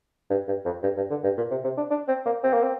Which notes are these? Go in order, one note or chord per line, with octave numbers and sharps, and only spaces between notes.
G2
G2
F2
G2
G2
D3
G2
A#2
C3
C3
D4
D4
C4
A#3
C4
A#3
C4